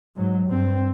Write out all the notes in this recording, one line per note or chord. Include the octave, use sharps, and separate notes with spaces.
G#2 F#3
G2 C4